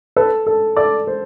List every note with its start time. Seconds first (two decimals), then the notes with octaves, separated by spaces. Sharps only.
0.16 A4 B4
0.47 A4
0.76 A4 D5
1.07 C5